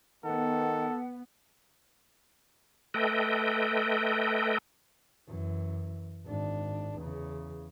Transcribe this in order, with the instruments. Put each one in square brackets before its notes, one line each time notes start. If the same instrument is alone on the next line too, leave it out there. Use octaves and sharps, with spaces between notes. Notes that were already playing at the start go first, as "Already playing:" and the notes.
[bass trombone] D#3 [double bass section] B3 [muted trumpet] A4 [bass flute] F#5
[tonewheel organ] A3 A4 B4 D#5 G5
[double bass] F#2 E3
G#1 D4
E2 C#3